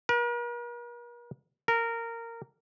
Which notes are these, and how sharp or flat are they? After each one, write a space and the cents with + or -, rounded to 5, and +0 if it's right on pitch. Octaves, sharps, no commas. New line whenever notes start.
A#4 +45
A#4 -15